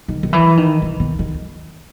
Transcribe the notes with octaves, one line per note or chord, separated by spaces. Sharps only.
D#3
D#3
E3
D#3
E3
D#3
D#3